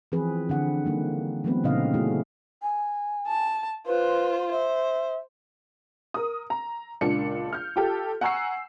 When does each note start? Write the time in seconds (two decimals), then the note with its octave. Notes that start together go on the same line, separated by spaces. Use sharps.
0.12 E3 F3 C4 G#4 B4
0.49 D3 C4 F#5
0.84 D#3 G3 A#3 D#4
1.44 E3 F#3 A3 B3 C4 B4
1.64 A#2 C#3 C4 D#4 D#5 F5
1.94 A3 C#4 E4 F#4 G#4
2.62 G#5
3.27 A5
3.87 F4 B4 C5
4.51 C5 E5
6.14 A#4 D#6
6.50 A#5
7.01 C#2 A#2 D4 C#7
7.53 F6 G6
7.76 F4 G4 A4
8.21 F#5 G#5 A#5 C#6 E6 C7